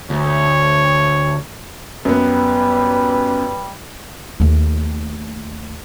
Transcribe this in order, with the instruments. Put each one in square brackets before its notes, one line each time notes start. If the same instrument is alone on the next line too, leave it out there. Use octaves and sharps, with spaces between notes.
[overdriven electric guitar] D2 [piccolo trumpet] C#5
[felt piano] F#2 B3 [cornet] G3 [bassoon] B4
[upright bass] D#2 A3